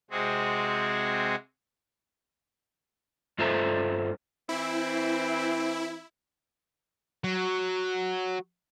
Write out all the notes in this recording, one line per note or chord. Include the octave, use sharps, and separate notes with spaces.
C3 G#3 C4 F#4 G#4
G2 F4 A4 C5 E5 A#5
E3 C4 E4
F#3